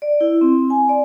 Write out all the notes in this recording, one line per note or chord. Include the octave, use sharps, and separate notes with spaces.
D5
E4
C4
G#5
D5